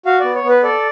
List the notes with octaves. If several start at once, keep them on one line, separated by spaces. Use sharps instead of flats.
F#4 F5
B3 D5
C#5
B3
B4
A4 D5